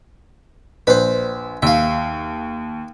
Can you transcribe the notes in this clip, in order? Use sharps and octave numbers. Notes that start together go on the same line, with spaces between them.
A#1 B4 C5
D#2 E5 F5